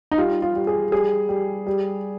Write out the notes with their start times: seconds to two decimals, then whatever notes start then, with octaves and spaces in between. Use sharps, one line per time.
0.11 D#4
0.18 G3 F4
0.42 F4
0.55 G3
0.67 G#4
0.92 G3 G#4
1.29 G3
1.67 G3